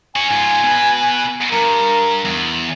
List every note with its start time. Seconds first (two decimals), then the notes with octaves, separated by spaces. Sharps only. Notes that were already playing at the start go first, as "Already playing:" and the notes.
0.16 C#4 F#4 G#5
0.31 G#2 F4
0.64 B2 B4
1.52 G2 A#4
2.25 E2